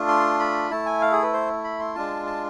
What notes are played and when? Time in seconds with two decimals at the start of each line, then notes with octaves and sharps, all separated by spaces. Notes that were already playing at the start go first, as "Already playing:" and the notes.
Already playing: A3 D4 F4
0.08 C6
0.39 B5
0.70 A3 E4 A5
0.86 G#5
1.02 F5
1.12 G#4
1.22 B4
1.33 C5
1.64 B5
1.80 C6
1.95 G#3 D4 F4 A5
2.26 A5